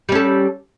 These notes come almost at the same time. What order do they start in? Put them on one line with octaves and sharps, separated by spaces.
G3 C#4 A4